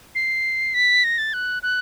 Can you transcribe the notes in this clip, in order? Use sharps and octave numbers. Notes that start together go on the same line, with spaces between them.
C7
B6
A#6
A6
F#6
F#6